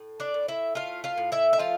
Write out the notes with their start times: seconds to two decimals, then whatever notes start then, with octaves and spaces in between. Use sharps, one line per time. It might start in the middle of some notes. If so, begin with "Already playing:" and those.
Already playing: A2
0.20 D4 D5
0.34 A2
0.48 E4 E5
0.75 A3 F4 F5
1.04 F4 F5
1.17 A2
1.32 E4 E5
1.53 E5
1.59 F3 F4 F5